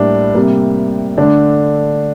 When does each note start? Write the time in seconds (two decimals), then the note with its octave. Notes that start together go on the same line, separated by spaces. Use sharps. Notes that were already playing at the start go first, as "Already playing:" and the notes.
Already playing: A2 G3 A#3 D4
0.35 C3 G3 A#3
1.18 D3 A3 D4